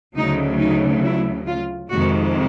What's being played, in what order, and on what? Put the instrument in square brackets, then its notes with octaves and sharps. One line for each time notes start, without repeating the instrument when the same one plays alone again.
[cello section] D2 C#3 F#3 D#4
D#4
E4
F4
F2 C3 D#3 G#3 F#4